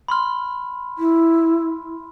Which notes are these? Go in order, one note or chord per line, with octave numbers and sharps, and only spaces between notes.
B5 C6 F6
E4